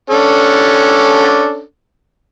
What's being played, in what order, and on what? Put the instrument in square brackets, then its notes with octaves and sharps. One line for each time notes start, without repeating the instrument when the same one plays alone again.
[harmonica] C#4 D4 A4